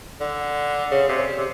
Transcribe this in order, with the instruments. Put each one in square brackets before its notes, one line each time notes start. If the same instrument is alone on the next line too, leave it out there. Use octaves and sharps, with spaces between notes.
[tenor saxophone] D3
C#3
C3
C#3
C3